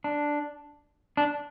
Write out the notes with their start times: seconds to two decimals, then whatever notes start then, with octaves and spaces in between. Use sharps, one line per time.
0.04 D4
1.17 D4